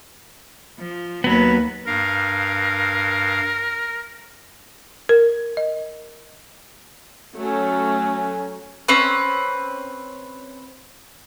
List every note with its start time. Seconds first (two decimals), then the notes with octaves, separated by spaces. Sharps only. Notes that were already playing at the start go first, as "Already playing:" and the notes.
0.79 F3
1.24 D#2 F#3 B3 B4
1.87 G2 A#4 F5
5.09 A#4
5.57 D#5
7.37 F#3 A3 C#4
8.88 C4 C#4 B4